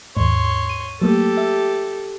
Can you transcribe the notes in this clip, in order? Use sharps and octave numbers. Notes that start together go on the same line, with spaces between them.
D#2 G#2 C#5 C6
D#7
F#3 A3 A#3 G4 A4
E5